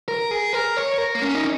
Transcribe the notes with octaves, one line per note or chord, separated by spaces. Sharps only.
A#4
G#4
A#4
C#5
C#5
A#4
A#3
C#4
D#4